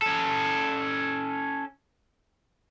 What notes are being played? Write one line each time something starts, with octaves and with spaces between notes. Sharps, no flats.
C#4 A4